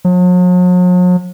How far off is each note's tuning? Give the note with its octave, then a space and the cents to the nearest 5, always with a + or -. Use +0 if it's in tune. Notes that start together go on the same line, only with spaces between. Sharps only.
F#3 -45